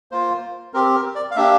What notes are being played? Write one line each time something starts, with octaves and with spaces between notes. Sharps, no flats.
A#3 F4 C5
C4 G4 A#4
A#4
D5
F5
A#3 D4 G4 E5